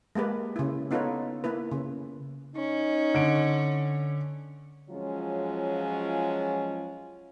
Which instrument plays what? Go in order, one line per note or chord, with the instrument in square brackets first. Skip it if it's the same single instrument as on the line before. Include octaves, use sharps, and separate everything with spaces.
[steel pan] G#3 A#3 G4 B4
C#3 E4
B3 D#4 F4 A4 B4 C#5
A#3 E4 B4
C#3
[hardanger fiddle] C#4 [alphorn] D#4
[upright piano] D3 D7
[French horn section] F3 F#3 G#3 C#4 F4